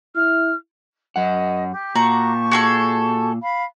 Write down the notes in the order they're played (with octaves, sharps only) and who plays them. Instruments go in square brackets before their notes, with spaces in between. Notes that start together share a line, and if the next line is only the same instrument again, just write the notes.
[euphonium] E4 [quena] F6
[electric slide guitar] F#2 F#5 [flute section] D#5
[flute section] G4
[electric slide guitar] A#2 [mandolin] F#4 A#5 [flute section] G4 A5 C#6
[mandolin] F#4 G#4 A4
[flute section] F5 B5